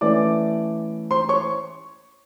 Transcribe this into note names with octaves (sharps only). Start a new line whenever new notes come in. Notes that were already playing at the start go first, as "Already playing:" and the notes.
E3 A3 C#4 D5 D6
C5 C6
C#5 C#6